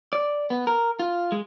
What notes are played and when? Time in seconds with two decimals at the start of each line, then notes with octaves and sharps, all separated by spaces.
0.13 D5
0.50 B3
0.67 A#4
0.99 F4
1.32 G#3